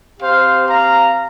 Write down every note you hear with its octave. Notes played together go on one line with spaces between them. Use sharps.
C4 G4 C5 F5
F5 A#5